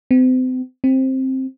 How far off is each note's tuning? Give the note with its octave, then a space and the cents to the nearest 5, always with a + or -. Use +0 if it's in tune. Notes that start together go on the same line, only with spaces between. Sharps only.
C4 -40
C4 +10